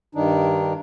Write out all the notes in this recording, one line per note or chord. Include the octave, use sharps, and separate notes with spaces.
G2 D#3 D4 D#4